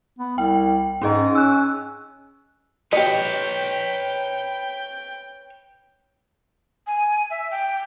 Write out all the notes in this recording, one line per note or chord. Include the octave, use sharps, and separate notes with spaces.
B3
C2 G5
G#2 C#4 G#4 D#5
C#4 E6 F#6
G4 B4 C#5 D#5 G5
G#5
E5
G5